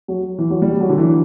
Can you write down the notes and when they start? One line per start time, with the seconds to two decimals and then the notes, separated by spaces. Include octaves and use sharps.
0.08 F#3
0.39 E3
0.50 F#3
0.62 G3
0.80 F#3
0.89 D3
0.98 E3